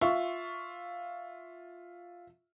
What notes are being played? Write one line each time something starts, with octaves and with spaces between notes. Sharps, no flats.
F4 E5 C#6